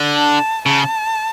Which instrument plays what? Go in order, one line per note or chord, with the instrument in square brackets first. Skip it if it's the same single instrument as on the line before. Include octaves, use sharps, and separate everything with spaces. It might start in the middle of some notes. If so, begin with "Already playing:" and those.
Already playing: [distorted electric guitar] D3
[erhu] A5
[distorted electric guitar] C#3 [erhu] A5